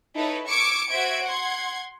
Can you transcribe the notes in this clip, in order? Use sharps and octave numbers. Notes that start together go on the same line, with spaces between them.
D#4 E4 A4 B4 C#5
C#6 D6 E6 G#6 C#7 D7
F#4 C5 E5 G#6 D7
F#5 C6 G#6